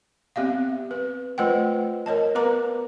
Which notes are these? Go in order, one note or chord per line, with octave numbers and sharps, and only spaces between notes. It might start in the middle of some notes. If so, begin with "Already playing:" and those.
B3 C4 G4 E5 F5
B4
A3 F4 B4 C5 F#5 G5
A#4 C#5 D#5 A5
B3 A#4 B4 A#5 D6